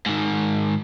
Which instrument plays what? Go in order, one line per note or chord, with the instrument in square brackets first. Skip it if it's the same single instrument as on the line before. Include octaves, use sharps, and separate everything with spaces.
[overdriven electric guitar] G#2 D#3